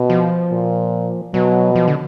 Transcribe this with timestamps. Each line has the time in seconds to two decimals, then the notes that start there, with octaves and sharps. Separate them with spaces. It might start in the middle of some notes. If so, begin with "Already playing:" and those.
Already playing: B2
0.10 F3
0.51 A#2
1.34 B2 F#3
1.75 F3
1.88 D3